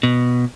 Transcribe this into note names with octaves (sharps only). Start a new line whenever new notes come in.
B2